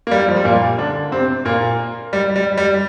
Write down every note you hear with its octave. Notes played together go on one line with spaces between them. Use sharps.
A#3
G3
F3
G3
A#2 A#3
D3 D4
C3 C4
A#2 A#3
G3
G3
G3